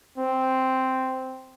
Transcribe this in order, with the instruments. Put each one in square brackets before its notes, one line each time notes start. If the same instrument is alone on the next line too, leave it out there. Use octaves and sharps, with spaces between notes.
[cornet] C4